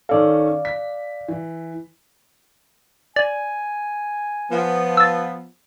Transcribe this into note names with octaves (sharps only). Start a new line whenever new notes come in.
D#3 C#4 A4 D5 F5
B6
E3
D5 G#5
F3 B3
E6 A6